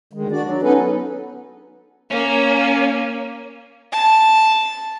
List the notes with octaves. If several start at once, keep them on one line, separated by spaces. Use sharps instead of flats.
D2 D#3 G#3
D4 F#4 D5
F#3
B3 C#4 D#4 G#4 A4 B4
A#3 C#4
A5